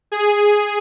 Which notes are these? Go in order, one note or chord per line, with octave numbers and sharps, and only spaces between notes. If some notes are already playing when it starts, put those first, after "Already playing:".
G#4